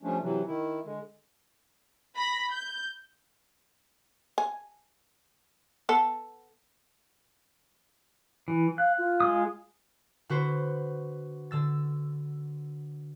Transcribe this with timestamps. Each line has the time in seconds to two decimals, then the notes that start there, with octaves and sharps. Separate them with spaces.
0.03 F3 G3 A3 C#4 D4
0.22 C3 E3 F#3
0.47 D#3 E4
0.85 D3 G#3
2.17 B5 A#6
2.51 G6
4.38 G#5
5.89 B3 A4 A5
8.48 E3
8.78 F5 F#6
8.98 F4
9.20 G#3 D#6
10.29 D3 F#4 B4 C5
11.51 D3 E6 A6